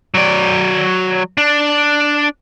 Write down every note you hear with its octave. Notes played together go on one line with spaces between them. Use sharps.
F#3 D5
D4